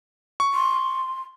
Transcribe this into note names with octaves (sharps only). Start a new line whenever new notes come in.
C#6
C6